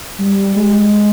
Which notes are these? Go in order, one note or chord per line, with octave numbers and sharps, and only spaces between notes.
G3
G#3